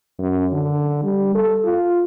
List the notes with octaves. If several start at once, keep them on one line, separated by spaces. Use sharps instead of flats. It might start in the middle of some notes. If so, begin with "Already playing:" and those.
F#2
D3
G3
A4
F4